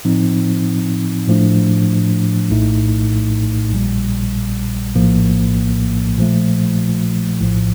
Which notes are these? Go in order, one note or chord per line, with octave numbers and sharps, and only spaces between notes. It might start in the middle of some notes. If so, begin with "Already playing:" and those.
A2 F3 C4 D#4
A2 F3 A3 D4
A#1 A2 A3 D#4
A#1 A#2 G3
A#1 A2 F3 A#3
A#2 F3 A3
A#1 A2 F3